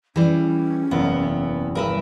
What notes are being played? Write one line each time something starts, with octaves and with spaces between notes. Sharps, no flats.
E3 G3 C#4 G#4
F#1 E2 C3 B3
G2 A#4 B4 E5